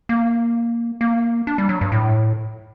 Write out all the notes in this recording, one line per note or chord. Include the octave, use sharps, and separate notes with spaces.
A#3
A#3
D4
G3
F#3
G2
A2